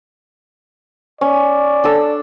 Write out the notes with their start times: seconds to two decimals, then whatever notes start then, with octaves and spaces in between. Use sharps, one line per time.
1.21 C#4 D5
1.84 D4 A4 E6